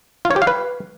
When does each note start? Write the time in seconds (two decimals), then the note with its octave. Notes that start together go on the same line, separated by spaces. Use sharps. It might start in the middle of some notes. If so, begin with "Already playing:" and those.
0.25 F4
0.31 C#5
0.36 G4
0.42 F5
0.47 B4